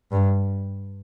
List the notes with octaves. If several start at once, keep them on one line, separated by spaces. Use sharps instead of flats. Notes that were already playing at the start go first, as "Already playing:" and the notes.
G2